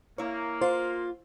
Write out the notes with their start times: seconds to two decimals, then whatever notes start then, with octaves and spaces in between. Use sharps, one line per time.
0.18 A#3 E4 C#5
0.61 F4 C5